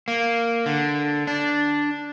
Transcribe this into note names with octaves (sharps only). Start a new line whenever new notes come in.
A#3
D3
D4